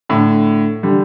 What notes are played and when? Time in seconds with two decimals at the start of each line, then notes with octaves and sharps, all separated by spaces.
0.09 A2 D3
0.83 D3 G3